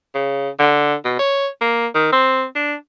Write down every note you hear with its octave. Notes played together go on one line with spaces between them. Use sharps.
C#3
D3
B2
C#5
A#3
D#3
C4
D4